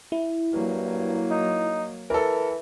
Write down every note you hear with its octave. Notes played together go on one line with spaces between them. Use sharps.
E4
G2 F#3 A#3
D#4
E3 A4 A#4